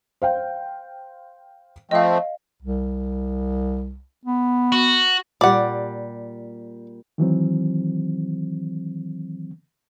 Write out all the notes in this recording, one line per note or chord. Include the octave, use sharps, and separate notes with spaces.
C5 F5 G5
F3 A3 C4 D#5 F5
C2
B3
F#4
A#2 G3 D5 F#5
D#3 E3 F#3 C4